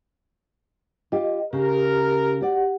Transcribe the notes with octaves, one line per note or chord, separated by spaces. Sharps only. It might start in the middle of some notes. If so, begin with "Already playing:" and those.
F4 G4 D#5
C#3 G4 A#4
F#4 G4 D5 F#5